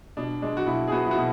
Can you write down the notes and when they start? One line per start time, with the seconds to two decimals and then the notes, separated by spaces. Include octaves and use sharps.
0.17 B2 D4
0.42 G#3 D4
0.57 F#4
0.66 B2 E4
0.87 G#4
0.92 B3 F#4
1.07 E4
1.11 F#4
1.17 B2